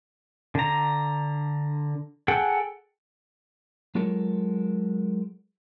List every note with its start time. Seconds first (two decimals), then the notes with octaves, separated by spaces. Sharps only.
0.55 D3 A#5
2.28 G#4 A4 F#5 G5
3.95 F#3 G#3 F4 A4 A#4 C#5